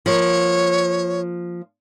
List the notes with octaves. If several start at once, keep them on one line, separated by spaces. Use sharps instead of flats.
F3 A#3 C#5